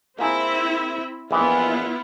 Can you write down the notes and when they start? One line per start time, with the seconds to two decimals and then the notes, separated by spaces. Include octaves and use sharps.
0.19 A#3 C4 E4 F4 G#4 E5
1.31 A#1 E3 B3 E4 F4 D#5